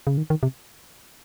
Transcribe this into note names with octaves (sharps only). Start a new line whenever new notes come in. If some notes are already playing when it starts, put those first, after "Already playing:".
C#3
D#3
D#3
C3